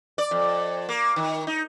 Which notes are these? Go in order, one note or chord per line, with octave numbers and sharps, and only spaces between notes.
D5
F2
A#3
D#3
D#4